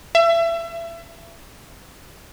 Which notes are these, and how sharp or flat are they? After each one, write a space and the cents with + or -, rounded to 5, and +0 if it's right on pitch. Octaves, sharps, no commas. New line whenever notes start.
E5 +30